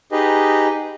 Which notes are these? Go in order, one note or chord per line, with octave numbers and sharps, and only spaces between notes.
D#4 G4 G#4 B4 D#5